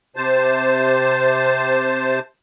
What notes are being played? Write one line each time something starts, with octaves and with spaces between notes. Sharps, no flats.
C3 C5 A5